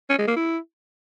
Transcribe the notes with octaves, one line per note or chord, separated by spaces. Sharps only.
C#4
G#3
A#3
E4